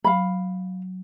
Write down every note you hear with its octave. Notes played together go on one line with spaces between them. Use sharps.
F#3 F5 B5